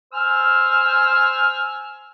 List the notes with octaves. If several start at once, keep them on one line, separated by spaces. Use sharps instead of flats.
C5 G#5 E6 F6